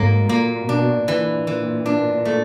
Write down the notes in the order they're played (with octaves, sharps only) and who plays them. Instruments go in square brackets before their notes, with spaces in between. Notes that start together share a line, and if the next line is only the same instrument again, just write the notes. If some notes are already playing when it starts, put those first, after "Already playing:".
Already playing: [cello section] G#2 [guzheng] F#3 A#3
[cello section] A#2 [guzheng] A#3
[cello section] B2 [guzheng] D4
[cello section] A#2 [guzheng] E3
[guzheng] E3
D4
A3